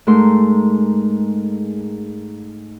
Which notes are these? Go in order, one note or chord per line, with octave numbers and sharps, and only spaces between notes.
G#2 G#3 A3 A#4 C6